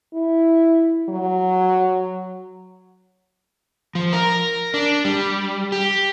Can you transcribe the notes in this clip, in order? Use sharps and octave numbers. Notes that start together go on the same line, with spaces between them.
E4
F#3
F3
A#4
D4
G3
G4